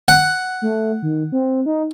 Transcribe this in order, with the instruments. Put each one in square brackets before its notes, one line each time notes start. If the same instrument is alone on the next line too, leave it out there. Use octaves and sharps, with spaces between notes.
[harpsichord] F#5
[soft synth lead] A3
D#3
C4
D#4